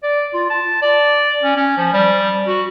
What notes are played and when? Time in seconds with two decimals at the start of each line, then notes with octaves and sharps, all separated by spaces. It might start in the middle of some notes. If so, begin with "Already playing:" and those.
0.03 D5
0.34 F4
0.50 A5
0.82 D5
1.43 C#4
1.56 C#4
1.77 F3
1.94 G3
2.48 F#4